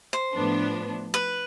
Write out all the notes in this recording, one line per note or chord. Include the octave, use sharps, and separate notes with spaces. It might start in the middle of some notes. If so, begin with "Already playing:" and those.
C5
A2 F3 B3 D4
B4